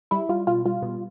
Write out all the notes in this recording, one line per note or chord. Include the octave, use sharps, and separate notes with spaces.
G3 E4
G3 F4
B2 F4
G3 F4
B2